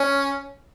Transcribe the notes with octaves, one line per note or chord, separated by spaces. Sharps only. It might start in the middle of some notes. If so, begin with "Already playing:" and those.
Already playing: C#4